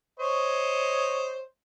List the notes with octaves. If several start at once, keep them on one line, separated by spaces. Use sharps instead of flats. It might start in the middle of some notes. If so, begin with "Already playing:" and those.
C5 C#5 D#5